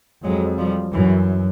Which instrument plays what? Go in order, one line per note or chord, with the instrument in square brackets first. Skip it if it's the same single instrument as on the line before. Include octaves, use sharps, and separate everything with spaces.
[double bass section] F2 [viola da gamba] F#3 G#3
[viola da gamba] F3 G3
[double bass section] F#2 [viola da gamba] E3 F#3